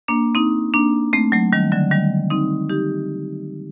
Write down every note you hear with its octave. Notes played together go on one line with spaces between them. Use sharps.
A#3 D4
C4 D#4
A#3 D4
A3 C4
F#3 A3
D#3 G3
D3 F#3
D#3 G3
C4 D#4
D#4 G4